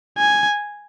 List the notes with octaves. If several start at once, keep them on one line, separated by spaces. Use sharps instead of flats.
G#5